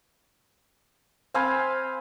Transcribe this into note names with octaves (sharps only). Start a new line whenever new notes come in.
C4 F5 G#5 B5